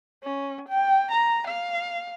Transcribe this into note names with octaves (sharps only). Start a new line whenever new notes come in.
C#4
G5
A#5
F5